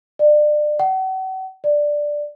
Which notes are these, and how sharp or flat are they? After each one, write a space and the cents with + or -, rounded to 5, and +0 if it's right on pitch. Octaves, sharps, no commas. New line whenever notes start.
D5 +30
F#5 +40
D5 +5